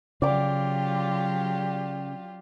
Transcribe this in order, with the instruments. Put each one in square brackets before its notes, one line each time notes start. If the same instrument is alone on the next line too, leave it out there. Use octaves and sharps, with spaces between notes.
[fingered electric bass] C#3 [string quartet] F#3 F4 G4 [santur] D5 D6